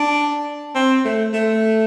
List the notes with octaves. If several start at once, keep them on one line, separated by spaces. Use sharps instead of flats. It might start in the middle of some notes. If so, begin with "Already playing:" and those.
Already playing: D4
C4
A3
A3